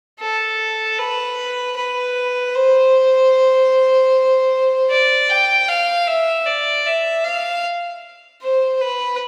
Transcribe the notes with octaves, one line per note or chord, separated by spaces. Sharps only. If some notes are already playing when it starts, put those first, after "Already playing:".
A4
B4
B4
C5
D5
G5
F5
E5
D5
E5
F5
C5
B4